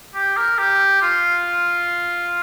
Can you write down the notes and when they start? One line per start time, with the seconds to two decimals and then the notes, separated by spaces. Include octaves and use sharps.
0.14 G4
0.37 A#4
0.58 G4
1.02 F4